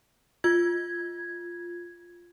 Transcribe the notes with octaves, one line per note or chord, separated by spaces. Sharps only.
F4 G#6